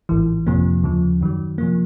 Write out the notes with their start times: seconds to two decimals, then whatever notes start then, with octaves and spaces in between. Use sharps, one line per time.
0.09 A1 G#2 E3
0.47 F2 C3 F3 A#3
0.83 D#2 C#3 F3
1.21 F#2 D#3 F#3
1.58 C3 F3 A#3